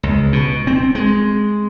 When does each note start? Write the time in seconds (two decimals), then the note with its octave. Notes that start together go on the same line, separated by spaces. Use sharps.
0.03 C#2
0.33 B2
0.67 C4
0.95 G#3